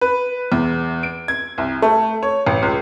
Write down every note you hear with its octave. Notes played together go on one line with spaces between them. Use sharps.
B4
E2
D7
G#6
C2
A3
C#5
A1
C#2